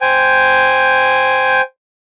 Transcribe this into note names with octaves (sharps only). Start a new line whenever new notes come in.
C5 G5 G#5